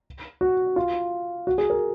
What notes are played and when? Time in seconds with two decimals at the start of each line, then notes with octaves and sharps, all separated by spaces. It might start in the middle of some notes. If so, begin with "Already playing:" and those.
0.41 F#4
0.76 F4
1.47 F#4
1.58 G#4
1.70 A#4